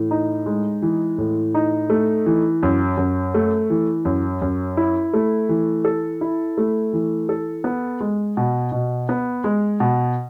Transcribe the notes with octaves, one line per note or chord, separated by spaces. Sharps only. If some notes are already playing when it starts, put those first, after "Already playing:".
Already playing: A2 E3
D#4
G#3
E3
A2
D#4
A3
E3
F#2
F#2
A3
E3
F#2
F#2
E4
A3
E3
A4
E4
A3
E3
A4
B3
G#3
B2
B2
B3
G#3
B2